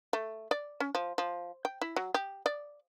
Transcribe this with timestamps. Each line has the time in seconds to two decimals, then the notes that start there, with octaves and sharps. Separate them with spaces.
0.13 A3
0.51 D5
0.80 C#4
0.95 F3
1.18 F3
1.65 G5
1.81 E4
1.96 F#3
2.14 G4
2.46 D5